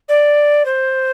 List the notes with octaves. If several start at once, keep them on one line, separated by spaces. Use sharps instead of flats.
D5
C5